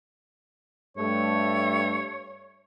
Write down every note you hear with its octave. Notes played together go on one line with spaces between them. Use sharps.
G2 A3 C#5